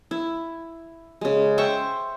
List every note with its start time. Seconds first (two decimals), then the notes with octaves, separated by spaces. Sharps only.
0.11 E4
1.21 C#3 G#3
1.58 C5 E5 G5 C#6